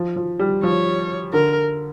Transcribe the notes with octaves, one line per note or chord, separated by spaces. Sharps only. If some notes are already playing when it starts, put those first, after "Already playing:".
Already playing: F3
F3
G3
F3 C#5
D3 A#4